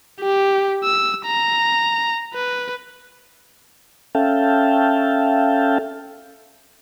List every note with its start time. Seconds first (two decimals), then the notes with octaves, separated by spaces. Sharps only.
0.21 G4
0.84 E6
1.26 A#5
2.34 B4
4.15 C#4 A4 E5 F5 G5 A5